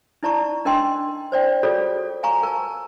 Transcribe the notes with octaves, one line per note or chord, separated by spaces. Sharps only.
D#4 E4 D5 A5 A#5 C#6
D4 A#4 D#5 G5 C6
C5 D5 G5
F4 F#4 G#4 A4 C#5 D5
F5 G#5 A#5 C#6
A#4 A5